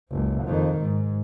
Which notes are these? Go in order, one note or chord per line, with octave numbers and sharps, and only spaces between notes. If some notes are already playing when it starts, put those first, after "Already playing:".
F#1 C#2
F2 D#3
G#2